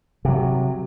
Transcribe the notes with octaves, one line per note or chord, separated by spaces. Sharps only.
C3 F#3